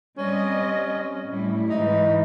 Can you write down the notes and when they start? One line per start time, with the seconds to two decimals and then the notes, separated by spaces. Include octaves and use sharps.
0.18 G3 C4 C#4 D#5
1.27 A2 G3 E4
1.69 G#2 E3 D#4